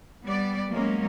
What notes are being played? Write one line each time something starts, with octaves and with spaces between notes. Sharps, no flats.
G3 B3 D5
F#3 G#3 A#3 C#4